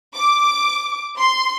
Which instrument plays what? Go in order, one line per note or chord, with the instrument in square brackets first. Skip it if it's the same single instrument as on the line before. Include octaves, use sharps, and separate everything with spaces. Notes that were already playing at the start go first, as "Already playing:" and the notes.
[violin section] D6
C6